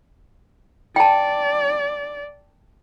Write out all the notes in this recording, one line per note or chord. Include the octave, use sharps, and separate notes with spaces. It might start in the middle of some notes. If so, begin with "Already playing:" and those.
D5 G5 A5